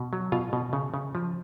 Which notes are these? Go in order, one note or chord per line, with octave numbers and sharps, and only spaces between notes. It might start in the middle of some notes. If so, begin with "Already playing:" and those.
Already playing: B2
F#3
B2 F4 F5
B2
C#3
C#3
F3